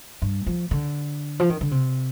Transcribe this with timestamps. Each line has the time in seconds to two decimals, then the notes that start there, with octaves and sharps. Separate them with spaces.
0.22 G2
0.47 F3
0.71 D3
1.40 F3
1.50 D#3
1.61 D3
1.71 C3